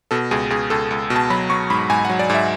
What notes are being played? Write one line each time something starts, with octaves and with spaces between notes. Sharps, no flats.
B2 A4
C#2 G#4
C#2 G#4
C#2 A4
C#2
B2
A5
F#3 B5
F#3 C#6
G#2 B5
G#2 G#5
F#5
F#3
D5
G#2 E5